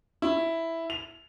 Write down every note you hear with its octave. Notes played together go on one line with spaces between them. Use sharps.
E4
F7